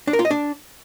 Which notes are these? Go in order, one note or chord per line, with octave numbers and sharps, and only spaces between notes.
D4
A#4
F4
D#5
D4